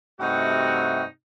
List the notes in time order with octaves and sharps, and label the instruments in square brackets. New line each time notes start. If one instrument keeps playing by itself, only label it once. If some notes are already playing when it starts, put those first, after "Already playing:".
[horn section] G2 C3 A3 D#4 F#4